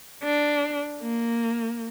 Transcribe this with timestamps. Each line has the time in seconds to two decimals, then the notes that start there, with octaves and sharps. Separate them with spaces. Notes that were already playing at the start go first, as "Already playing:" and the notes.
0.24 D4
1.02 A#3